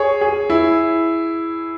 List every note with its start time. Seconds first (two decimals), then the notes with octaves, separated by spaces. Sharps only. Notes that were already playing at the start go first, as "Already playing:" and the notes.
Already playing: G#4 C#5
0.21 G#4
0.50 E4